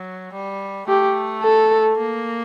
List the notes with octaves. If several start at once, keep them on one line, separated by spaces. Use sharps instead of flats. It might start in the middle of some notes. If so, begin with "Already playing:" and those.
Already playing: F#3
G3
A3 G4
A4
A#3